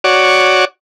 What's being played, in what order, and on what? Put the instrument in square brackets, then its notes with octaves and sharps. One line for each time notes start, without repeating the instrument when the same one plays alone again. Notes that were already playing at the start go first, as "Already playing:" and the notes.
[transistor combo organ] F#4 C#5 D5